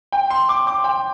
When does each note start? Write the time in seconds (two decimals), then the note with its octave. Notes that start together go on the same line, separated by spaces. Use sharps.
0.12 G5
0.30 C6
0.49 D6
0.67 D6
0.84 G5